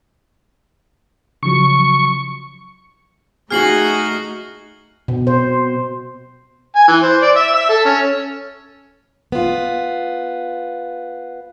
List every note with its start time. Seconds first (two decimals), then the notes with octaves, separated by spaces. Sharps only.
1.43 C#3 F3 F#3 C#6
3.51 A3 D#4 F#4 G#4 F6 C7 F#7
5.08 B2
5.27 C5
6.75 G#5
6.88 E3
7.03 C5
7.22 D5
7.36 E5
7.54 E5
7.69 A4
7.85 C#4
9.32 B3 F4